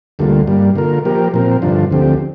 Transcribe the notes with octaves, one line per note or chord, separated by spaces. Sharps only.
D2 D3 G3 A#3 F4
G2 G3 A#3
D3 A#3 F4 A#4
F3 A#3 G4 A#4
A#2 F3 C4 A#4
G2 D3 F3 D4 F4
D2 D3 F3 C4 G4